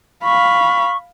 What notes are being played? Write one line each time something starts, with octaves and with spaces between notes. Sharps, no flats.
F5 B5 C#6